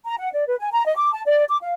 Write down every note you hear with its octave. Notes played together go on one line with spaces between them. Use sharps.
A#5
F#5
D5
B4
G#5
A#5
D#5
D6
A5
D5
D6
F5